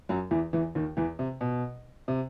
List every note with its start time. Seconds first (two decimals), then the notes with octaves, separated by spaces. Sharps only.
0.09 F#2 F#3
0.31 E2 E3
0.53 E2 E3
0.75 D#2 D#3
0.97 E2 E3
1.19 C3
1.41 B2
2.08 C3